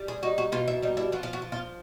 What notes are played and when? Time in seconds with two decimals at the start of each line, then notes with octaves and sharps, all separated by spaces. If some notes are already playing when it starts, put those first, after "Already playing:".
Already playing: G3
0.08 G#4
0.23 D#4 F#4
0.38 F#4
0.52 B2 F4
0.68 E4
0.83 G3 D#4
0.97 E4
1.12 F3 F#4
1.23 F4
1.33 F#4
1.42 F3
1.52 F4